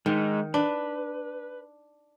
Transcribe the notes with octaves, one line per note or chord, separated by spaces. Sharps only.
D#3 G#3 D#4
D4 B4